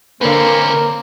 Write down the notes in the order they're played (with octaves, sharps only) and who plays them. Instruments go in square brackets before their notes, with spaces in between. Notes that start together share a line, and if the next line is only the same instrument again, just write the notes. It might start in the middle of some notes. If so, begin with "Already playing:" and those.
[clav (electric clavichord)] D3 B4 [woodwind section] A#3 [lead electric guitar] C4 C#4 [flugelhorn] A#4